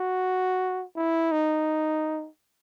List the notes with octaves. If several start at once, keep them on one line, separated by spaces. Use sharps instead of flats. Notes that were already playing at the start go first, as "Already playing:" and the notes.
Already playing: F#4
E4
D#4